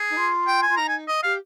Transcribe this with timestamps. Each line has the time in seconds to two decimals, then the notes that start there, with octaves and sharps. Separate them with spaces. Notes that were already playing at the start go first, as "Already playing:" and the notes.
Already playing: G#4
0.09 D#4
0.16 F4
0.47 G5
0.62 G#5
0.68 F4
0.77 D#4 A#5
0.88 G#5
1.08 D#5
1.23 G4 F5